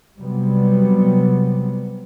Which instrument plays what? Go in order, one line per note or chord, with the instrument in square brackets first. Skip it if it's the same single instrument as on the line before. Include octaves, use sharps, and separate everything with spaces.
[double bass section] C3 F#3 G3 B3